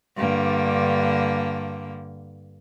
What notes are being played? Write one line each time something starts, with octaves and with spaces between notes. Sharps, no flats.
G2 D3 A#3